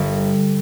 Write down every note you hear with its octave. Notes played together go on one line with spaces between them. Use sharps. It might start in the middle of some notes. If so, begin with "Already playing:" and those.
Already playing: G1